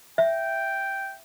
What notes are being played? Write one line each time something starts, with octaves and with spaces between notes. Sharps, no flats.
E5 G5